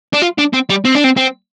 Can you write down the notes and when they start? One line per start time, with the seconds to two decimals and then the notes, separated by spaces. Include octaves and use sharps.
0.13 D4
0.22 F4
0.38 D4
0.53 C4
0.70 G3
0.85 C4
0.95 D4
1.04 C4
1.17 C4